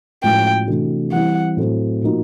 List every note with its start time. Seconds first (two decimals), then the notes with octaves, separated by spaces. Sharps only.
0.23 A2 F3 G#3 C#4 F#4 G5
0.68 C3 E3 A3 D4 F#4
1.12 E3 G3 C4 E4 F#5
1.57 A2 F#3 A3 C4
2.02 A#2 F3 A#3 D#4 F#4